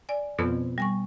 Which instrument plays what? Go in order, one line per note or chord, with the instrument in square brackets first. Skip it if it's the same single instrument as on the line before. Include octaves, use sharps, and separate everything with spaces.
[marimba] D5 G#5
[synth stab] F2 [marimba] B2 B3
[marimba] G3 G#5 C#6